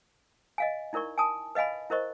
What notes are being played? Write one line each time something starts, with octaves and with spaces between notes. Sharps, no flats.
D#5 F5 G#5
D#4 E4 A#4 D5 C#6
G#5 A5 D#6
B4 D#5 F5 G#5 B5
E4 A#4 C5 D#5 C#6